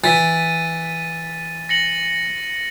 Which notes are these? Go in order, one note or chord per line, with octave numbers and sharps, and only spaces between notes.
E3 A6 B6 D#7
A#6 C#7 F#7